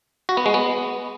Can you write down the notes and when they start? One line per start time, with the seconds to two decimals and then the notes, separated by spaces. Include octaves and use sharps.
0.29 F#4
0.37 B3
0.46 G#3
0.54 B3